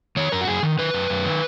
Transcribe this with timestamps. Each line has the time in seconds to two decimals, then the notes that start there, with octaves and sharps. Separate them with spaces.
0.16 D#3 C#5
0.32 F#2 A#4
0.41 F#4
0.47 F#2 G#4
0.63 D#3
0.79 D#3 B4
0.94 F#2
1.10 F#2
1.26 D#3